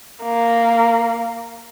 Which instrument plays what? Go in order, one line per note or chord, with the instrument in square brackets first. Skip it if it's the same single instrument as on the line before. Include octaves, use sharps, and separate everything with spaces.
[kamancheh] A#3